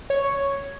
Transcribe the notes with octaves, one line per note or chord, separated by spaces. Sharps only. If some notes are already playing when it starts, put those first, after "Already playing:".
C#5